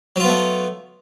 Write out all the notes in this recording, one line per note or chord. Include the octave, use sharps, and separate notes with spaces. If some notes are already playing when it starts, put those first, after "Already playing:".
F#3 A3 B3 F4